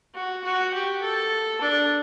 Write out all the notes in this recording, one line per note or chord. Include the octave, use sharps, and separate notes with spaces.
F#4
F#4
G4
A4
D4